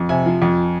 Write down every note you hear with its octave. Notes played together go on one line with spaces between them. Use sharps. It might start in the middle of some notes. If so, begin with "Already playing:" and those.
Already playing: F2
C3 G#5
F3
F2